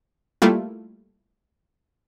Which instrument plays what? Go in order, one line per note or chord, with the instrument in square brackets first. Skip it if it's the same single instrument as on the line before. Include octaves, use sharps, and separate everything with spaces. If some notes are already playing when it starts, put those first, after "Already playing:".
[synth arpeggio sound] G3 A3 A#3 E4 F4